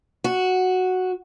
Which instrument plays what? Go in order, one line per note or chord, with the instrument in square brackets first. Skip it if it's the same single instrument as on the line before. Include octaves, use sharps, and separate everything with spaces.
[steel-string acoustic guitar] F#4